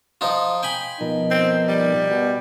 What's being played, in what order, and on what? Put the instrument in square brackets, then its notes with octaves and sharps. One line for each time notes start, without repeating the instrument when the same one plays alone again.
[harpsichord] F3 D#4 F4
G5 G#5 B5
[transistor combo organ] B2 F3 A#4 [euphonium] D#4
[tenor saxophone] C4
G3
[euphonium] B2